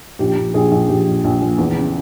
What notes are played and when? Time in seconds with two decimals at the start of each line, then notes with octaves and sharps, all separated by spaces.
0.19 A#1 G4
0.37 A#1
0.54 A#1 G#4
0.71 A#1
0.89 A#1 G4
1.07 A#1
1.24 A#1
1.42 A#2
1.58 E2
1.76 C#3